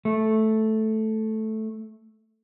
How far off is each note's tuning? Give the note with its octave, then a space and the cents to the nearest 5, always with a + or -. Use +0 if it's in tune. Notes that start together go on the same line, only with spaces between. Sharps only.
A3 -5